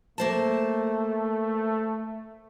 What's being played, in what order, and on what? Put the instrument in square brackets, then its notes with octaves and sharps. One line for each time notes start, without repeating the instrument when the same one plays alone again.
[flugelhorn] A3 [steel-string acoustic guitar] A#3 C5 A5